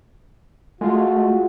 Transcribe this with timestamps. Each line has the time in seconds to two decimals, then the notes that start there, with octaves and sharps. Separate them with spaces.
0.81 G#3 A3 F4 F#4